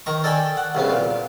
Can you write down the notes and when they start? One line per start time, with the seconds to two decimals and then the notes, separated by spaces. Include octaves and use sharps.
0.06 D#3 A#5 C#6
0.24 A4 D5 D#5 G5 G#5
0.57 F#5
0.75 C2 C#3 B3
0.90 A#2